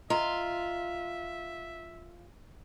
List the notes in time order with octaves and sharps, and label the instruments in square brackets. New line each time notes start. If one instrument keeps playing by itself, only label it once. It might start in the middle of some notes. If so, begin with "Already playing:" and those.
[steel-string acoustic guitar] F4 [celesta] D#5 A#5 C6 [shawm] E5